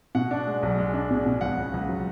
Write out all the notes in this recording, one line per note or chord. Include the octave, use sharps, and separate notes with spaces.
B2 F#5
D4
G#3
B1
G#3
D4
B2
B2
C#2 F#5
C#3
C#2
F#3